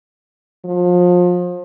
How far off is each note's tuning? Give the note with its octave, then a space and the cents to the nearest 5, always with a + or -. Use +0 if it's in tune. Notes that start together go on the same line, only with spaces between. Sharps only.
F3 +30